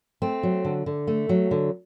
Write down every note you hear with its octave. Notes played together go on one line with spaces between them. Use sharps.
A3 C4
F#3
D3
D3
A3
F#3
D3